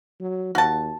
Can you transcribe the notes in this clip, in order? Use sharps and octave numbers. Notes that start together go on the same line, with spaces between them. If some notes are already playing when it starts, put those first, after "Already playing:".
F#3
D#2 F#4 A5